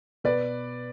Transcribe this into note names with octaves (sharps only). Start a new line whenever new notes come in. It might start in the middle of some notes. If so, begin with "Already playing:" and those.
B2 B4 D5